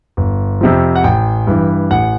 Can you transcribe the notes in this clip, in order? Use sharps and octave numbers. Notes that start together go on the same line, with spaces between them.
G1
F2 C3 F3
F#5
A1 G5
G2 E3
A1 F#5